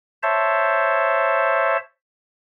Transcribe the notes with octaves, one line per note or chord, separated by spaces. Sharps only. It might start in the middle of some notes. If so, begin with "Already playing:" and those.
C5 C#5 E5 A5